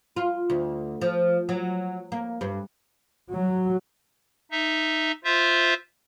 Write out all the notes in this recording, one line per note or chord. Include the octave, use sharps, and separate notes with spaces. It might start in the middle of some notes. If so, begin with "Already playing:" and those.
F4
D2
F3
F#3
A#3
G2
F#3
D#4 E5
F4 C5 E5